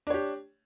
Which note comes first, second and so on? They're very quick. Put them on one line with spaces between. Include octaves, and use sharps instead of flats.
D4 C#5 G4